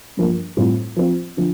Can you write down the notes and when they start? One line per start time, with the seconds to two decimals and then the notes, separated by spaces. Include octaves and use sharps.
0.17 G2 F3 A#3
0.57 A2 G3 C4 F4
0.96 F3 C4 F4
1.37 D3 F3